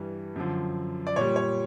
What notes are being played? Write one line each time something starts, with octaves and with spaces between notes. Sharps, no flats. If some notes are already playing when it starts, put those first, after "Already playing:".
Already playing: G2 E3 G3
F#2 D3 F3
D5
A#2 G3 C#5
C#5